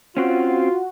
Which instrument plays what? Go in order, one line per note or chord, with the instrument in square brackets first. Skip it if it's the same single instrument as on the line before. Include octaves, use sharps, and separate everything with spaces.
[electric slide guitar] C4 C#4 [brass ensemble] F4 [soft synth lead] F#4